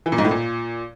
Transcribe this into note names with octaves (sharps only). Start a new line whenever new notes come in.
E3
A#2
G#2
A2
A#2